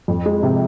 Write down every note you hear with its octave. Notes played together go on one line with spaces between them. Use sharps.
F2
G#3
C3